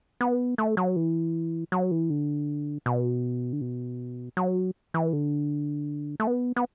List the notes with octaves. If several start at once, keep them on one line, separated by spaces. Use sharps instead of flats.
B3
A3
F#3
E3
F#3
E3
D3
B2
D3
B2
F#3
E3
D3
A3
B3
B3